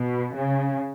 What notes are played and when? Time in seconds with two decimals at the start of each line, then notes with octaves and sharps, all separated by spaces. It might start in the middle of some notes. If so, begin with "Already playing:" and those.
Already playing: B2
0.34 C#3